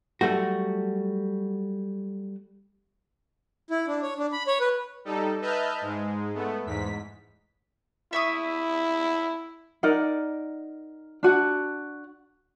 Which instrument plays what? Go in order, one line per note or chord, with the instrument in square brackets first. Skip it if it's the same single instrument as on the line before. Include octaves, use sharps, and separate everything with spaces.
[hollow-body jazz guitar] F#3 G3 A3 F#4
[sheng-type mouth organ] E4
D4
C#5
D4
B5
C#5
B4
[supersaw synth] G3 D#4 A4
B4 D#5 E5 A5 F6 G6
G#2 G#3
A3 B3
E2 G#2 B6
[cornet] E4 [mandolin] E5 C#6 D#6
[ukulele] D#4 A#4 D5 F#5
D4 F#4 F#5